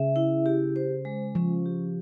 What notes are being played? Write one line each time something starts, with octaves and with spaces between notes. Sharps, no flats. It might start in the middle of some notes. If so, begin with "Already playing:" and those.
Already playing: C#3 E5
E4
G4
C5
G#3
F3 C#4
G4